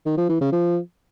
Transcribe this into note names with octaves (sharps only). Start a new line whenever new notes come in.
D#3
F3
E3
C#3
F3